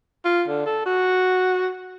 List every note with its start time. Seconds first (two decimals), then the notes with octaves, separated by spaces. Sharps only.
0.25 F4
0.48 D3
0.66 A4
0.86 F#4